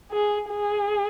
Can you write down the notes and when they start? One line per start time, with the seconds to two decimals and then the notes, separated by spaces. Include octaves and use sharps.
0.11 G#4
0.50 G#4